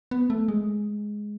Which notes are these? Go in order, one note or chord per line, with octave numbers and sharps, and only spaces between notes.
B3
A3
G#3